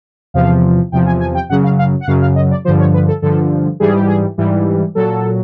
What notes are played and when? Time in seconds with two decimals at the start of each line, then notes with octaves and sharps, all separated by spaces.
0.34 E2 C3 F3 F5
0.92 E2 C3 F3 G5
1.06 G#5
1.21 G#5
1.35 G5
1.49 F#2 C#3 F#3 F#5
1.64 F5
1.79 F5
2.01 F#5
2.07 F#2 C#3 F#3 F5
2.22 F5
2.36 D#5
2.51 D5
2.65 G2 D3 F3 C5
2.79 C#5
2.94 B4
3.08 A4
3.22 G2 D3 F3 A4
3.80 G#2 E3 G3 G#4
3.94 G4
4.07 G#4
4.38 G#2 E3 G3
4.95 A#2 F#3 A4